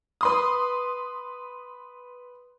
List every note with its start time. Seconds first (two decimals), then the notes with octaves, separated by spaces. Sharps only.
0.21 B4 C6 D#6